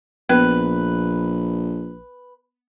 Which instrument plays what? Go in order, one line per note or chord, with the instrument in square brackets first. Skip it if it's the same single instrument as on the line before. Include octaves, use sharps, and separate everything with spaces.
[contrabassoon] A#1 [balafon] B3 [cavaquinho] B4